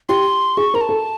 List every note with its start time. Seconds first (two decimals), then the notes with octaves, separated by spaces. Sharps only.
0.09 G4 C6
0.57 G#4 C#6
0.74 A#4 A#5
0.81 A5
0.89 A4